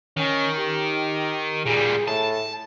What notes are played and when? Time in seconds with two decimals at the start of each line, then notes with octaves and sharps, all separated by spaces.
0.17 D#3 C#4
0.58 G4
1.66 A#2 G3 G#4
2.08 A2 A5